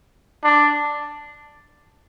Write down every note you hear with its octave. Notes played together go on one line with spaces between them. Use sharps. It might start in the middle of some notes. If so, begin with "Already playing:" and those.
D4